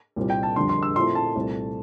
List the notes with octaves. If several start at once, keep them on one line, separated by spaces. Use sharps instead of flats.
C2 A#2 G3 C4
G5
A5
F2 D3 G3 D4 C6
C6
E6
A#2 F3 A3 C4 E4 C6
A5
C2 A#2 A3 C4